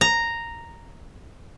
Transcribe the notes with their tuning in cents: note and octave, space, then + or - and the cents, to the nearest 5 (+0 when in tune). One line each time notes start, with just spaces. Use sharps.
A#5 -5